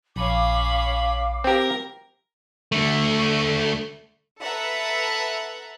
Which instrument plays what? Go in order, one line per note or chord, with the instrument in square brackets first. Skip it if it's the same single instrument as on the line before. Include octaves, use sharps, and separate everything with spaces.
[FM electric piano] A#1 [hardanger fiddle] C#4 B5 [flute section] F5 D6
[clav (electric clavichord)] C4 G4 [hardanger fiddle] A#4
[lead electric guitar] D3 A3
[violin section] A4 B4 E5 F#5 A5 A#5